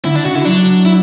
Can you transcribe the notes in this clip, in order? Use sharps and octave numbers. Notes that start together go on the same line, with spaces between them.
D3 E4
D4
C#3 F#4
D3 E4
F#3 D4
E4